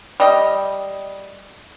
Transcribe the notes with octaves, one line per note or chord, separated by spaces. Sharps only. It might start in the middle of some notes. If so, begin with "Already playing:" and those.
G3 D#5